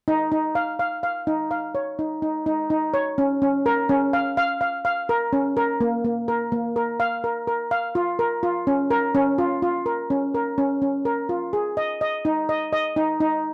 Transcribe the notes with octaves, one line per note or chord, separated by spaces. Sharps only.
D#4
D#4
F5
F5
F5
D#4
F5
C#5
D#4
D#4
D#4
D#4
C#5
C#4
C#4
A#4
C#4
F5
F5
F5
F5
A#4
C#4
A#4
A#3
A#3
A#4
A#3
A#4
F5
A#4
A#4
F5
F4
A#4
F4
C#4
A#4
C#4
F4
F4
A#4
C#4
A#4
C#4
C#4
A#4
F4
G#4
D#5
D#5
D#4
D#5
D#5
D#4
D#4